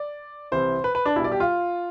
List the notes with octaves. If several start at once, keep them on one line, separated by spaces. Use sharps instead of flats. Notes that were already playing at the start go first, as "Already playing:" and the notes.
Already playing: D5
C2 C3 E3 C5
B4
B4
D4
B1 B2 G3 E4
D5
G4
F4